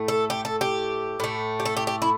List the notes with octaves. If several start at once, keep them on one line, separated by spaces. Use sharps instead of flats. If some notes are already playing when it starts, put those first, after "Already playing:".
Already playing: A2 A3
A4
G4
A4
G4
A2 A3
G4
A4
G4
G4
E4